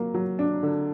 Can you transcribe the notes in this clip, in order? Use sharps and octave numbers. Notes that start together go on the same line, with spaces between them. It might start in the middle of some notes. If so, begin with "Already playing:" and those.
Already playing: F#3 A#3
F#3
D4
D3